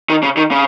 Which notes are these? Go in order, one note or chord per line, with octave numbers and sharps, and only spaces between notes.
D#3
C#3
D#3
C#3